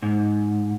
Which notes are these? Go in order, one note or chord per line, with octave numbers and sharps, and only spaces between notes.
G#2